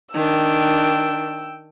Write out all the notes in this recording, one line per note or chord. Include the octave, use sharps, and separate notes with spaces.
D#3 D4 G5 E6